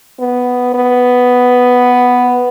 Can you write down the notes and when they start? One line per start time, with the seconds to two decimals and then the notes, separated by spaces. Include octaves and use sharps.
0.20 B3
0.74 B3